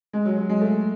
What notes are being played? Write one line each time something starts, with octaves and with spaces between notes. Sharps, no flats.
G#3
F#3
F#3
G#3
A3